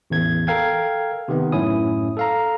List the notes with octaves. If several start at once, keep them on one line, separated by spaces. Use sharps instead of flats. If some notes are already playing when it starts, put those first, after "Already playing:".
A1 E2 G#6
A4 A#4 F5 G5 G#6
C3 D#3 B3
F#2 A2 C#4 E4 D#6
A4 F5 A#5